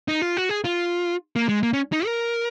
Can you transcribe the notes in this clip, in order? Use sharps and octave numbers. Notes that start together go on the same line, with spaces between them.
D#4
F4
F#4
G#4
F4
A#3
G#3
A#3
C#4
D#4
A#4